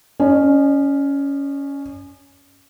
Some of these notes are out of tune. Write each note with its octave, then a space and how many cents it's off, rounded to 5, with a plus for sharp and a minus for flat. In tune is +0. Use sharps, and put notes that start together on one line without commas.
C#4 +10 D#5 -45